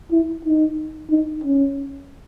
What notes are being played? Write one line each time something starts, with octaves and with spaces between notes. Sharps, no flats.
E4
D#4
D#4
C#4